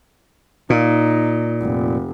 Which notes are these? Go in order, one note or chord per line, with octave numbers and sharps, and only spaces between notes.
A#2 D#4
F1